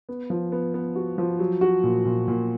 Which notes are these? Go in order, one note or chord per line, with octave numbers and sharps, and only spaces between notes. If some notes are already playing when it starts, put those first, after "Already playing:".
B3
F3
B3
B3
F#4
F3
F#3
F#4
A#2
A#2
A#2